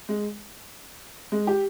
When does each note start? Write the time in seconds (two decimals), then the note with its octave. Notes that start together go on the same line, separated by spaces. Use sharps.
0.09 G#3
1.32 G#3
1.47 G4